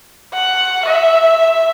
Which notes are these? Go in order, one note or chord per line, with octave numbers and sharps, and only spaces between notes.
F#5
E5